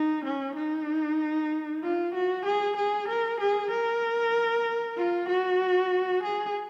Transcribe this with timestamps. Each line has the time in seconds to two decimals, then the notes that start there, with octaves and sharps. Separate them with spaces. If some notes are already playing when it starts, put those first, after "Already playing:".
Already playing: D#4
0.25 C#4
0.56 D#4
1.83 F4
2.14 F#4
2.45 G#4
2.76 G#4
3.08 A#4
3.40 G#4
3.71 A#4
4.97 F4
5.29 F#4
6.23 G#4